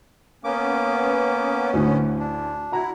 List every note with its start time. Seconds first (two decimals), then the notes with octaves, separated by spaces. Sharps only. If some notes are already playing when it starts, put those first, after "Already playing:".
0.44 A#3 B3 C#4 D6
1.73 D2 A2 D3
2.20 D4
2.72 E4 F#4 A#5